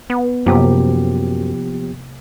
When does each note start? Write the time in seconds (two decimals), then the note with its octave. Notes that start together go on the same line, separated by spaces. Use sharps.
0.10 B3
0.46 F#2 C3 F3 A#3 B3 G4